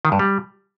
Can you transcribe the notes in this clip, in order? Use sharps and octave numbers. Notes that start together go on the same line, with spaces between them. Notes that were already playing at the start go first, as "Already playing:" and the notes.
D#3
G2
G3